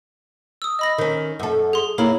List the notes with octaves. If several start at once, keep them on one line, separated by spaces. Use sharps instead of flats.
D#6 E6
D#5 B5 A#6
D#3 C#4
F#2 A4
G#4 C6
A#3 E4 C#5 A#5 B5